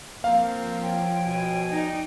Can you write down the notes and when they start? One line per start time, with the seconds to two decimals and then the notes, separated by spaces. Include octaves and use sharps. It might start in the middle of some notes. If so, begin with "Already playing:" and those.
0.24 F3 A#3 C4 F5
0.82 C#5 G5
1.25 B2 G#5
1.71 D#4 D5 D#5 G5